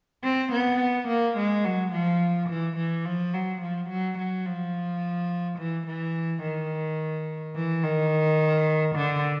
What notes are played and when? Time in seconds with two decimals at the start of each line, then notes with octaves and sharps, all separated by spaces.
0.24 C4
0.52 B3
1.08 A#3
1.37 G#3
1.65 F#3
1.92 F3
2.49 E3
2.77 E3
3.05 F3
3.34 F#3
3.62 F3
3.90 F#3
4.18 F#3
4.46 F3
5.58 E3
5.87 E3
6.43 D#3
7.56 E3
7.83 D#3
8.96 D3